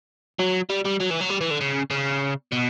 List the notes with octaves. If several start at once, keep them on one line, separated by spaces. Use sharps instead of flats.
F#3
G3
G3
F#3
E3
F#3
G3
E3
D3
C#3
C#3
B2